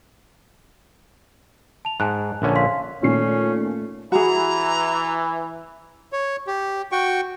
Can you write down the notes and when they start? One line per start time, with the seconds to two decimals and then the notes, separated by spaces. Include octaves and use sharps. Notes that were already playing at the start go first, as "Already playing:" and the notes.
1.85 A5 F7
2.00 G#2 G#5 A5 F#6
2.42 A#1 D3 C#4
2.56 F5 C6 B6
3.03 A#2 D#3 A3 C#4 C7
4.12 E3 F#4 G#4 A#5
6.13 C#5
6.47 G4
6.92 F#4 G5 C#6